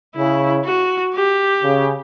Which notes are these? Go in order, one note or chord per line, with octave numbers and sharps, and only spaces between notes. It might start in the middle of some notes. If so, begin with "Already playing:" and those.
C#3 E4
F#4
G4
C#3